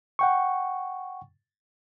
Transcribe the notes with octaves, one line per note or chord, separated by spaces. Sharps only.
F#5 G5 C#6